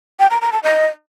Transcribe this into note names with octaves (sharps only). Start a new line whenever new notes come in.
G5
A#5
A#5
A5
D#5